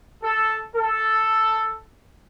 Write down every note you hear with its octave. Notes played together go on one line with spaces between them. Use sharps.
A4
A4